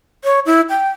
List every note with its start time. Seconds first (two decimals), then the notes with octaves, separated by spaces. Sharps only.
0.24 C#5
0.46 E4
0.70 G5